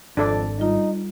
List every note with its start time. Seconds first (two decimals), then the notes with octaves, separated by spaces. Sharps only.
0.17 G#1 F2 D4 A4 D5
0.59 G3 D#4 F4